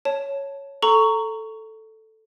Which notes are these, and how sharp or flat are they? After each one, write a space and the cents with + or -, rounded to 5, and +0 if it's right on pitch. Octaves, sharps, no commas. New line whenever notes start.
C#5 +0 A5 +0
A4 +0 A#5 -15 C#6 +10